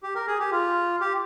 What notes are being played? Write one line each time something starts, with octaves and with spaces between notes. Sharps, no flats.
G4
A#4
G#4
G4
F4
G4